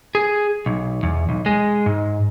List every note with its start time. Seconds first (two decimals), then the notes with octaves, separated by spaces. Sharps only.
0.15 G#4
0.66 B1
1.03 E2
1.29 B1
1.46 G#3
1.86 G#2